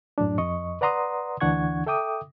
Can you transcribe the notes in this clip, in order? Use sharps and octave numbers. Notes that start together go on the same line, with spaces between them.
F#2 A2 F#3 D4
F2 D#5 C#6
B4 D5 F#5 A#5 C6 D#6
D2 E3 D4 F#5 C#6 G#6
A4 E5 G5 D6 D#6